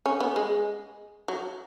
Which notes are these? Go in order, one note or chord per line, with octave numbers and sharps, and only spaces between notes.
C#4
B3
G#3
F#3